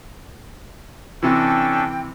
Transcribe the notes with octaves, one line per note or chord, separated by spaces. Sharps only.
C3 E3 C#4 D4 A4 G5